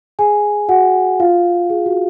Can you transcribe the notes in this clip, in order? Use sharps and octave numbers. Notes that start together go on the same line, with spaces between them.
G#4 G#5
F#4 F#5
F4 F5
G#4
F#4